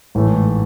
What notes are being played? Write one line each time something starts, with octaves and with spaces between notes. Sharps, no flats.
A1 G#2 E3 A3